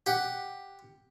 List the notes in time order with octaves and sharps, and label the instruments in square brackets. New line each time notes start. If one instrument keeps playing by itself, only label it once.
[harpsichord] G4 F#5